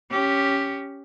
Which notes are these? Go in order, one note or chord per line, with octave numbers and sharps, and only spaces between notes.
C#4 G4